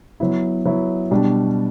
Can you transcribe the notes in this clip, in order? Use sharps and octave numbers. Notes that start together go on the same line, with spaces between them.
F#3 B3 E4
F#3 B3 E4
B2 G3 D4